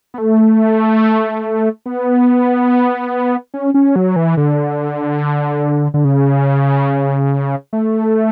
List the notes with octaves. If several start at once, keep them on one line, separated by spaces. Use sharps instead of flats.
B3
A3
B3
C#4
C#4
F#3
E3
D3
D3
C#3
A3